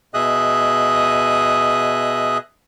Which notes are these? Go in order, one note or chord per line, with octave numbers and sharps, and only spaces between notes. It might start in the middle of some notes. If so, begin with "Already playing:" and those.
B2 G#4 D#5 E5 D#6 F#6